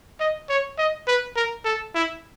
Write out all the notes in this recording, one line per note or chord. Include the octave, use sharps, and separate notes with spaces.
D#5
C#5
D#5
B4
A#4
A4
E4